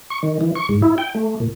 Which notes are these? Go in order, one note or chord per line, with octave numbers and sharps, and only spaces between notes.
C#6
D#3
E3
C#6
G#2
E4
G5
A3
A#2